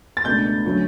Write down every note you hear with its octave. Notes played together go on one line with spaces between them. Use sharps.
A6
C#2 B2 A3 D4 G6
D3 F#3 A3 C#4